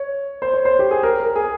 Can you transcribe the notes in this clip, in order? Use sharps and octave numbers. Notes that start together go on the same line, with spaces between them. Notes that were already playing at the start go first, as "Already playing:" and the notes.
Already playing: C#5
C5
C#5
C5
G4
G#4
A#4
A#4
G#4